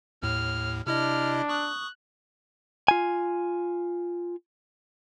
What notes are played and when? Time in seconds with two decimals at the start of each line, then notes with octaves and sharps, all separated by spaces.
0.23 D#2 A2 F6
0.87 C3 D4 E4 D#5 F6
1.49 C#6 D#6 F#6
2.88 F4 G#5